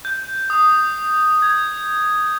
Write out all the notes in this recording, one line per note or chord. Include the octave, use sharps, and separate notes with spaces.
G6
D#6
G#6